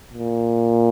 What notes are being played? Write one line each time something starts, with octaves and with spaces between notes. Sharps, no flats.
A#2